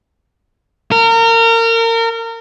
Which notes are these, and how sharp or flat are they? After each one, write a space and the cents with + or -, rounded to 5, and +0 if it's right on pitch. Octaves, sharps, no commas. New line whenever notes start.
A#4 -30